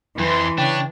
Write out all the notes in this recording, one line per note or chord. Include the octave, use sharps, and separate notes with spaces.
F2 E3 C6
C#3 D4 B4 C#5 G5